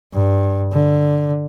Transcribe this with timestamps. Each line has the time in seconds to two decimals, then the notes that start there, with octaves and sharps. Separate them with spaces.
0.13 G2
0.73 D3